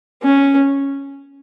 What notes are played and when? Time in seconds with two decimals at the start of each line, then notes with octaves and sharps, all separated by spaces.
0.22 C#4